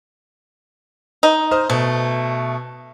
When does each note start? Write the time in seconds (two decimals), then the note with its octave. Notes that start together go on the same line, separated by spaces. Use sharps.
1.23 D#4
1.51 C5 D#5 F6
1.70 B2 A3